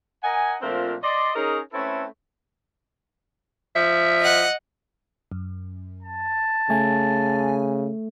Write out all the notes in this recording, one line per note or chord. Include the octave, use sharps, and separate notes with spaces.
A#4 D#5 F#5 G#5
A#2 F3 A3 C4 D4 A#4
D5 D#5 C6
C#4 D#4 G#4 A#4 C#5 D#5
A3 C4 C#4 E4 A4 B4
F3 E5
D#5 F#5
F#2
A5
C#3 A3 G#5